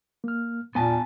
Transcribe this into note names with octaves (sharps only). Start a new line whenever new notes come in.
A#3 F6
E2 A#2 B3 G#5 A5